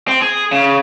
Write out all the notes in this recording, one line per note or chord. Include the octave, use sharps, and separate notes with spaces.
C4
G#4
C#3